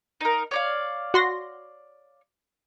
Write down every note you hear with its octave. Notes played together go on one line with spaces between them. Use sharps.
D#4 A#4
C#5 D5 F5
F#4 C6 A#6